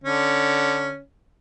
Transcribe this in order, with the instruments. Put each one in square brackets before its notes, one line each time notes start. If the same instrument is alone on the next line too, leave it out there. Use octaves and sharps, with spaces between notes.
[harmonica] D3 C#4